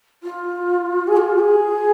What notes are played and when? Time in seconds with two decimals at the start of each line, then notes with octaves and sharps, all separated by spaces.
0.23 F4
1.07 G#4
1.17 F4
1.41 G#4